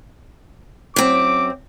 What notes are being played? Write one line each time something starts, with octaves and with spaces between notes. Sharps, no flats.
F#2 C4 D6